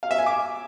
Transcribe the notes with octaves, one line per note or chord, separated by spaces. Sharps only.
F5
E5
G#5
D6